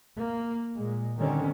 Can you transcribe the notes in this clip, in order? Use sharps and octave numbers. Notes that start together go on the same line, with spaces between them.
A#3
A#2 G#3
D3 D#3 G3 C4 C#4